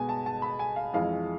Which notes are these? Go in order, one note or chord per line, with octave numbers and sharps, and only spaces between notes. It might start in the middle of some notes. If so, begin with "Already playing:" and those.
Already playing: B2 G#3 B3 G#5
A5
A5
B5
G#5
F5
F2 E3 G#3 F5